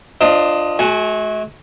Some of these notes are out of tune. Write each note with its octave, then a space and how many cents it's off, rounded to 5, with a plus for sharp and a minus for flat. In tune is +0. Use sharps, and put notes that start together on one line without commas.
F3 +0 D4 +25 D#5 +10
A3 -45 F#4 +0 G#5 -10